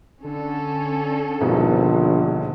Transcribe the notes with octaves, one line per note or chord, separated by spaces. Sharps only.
D3 C#4 A4
D#1 A#1 G#2 B2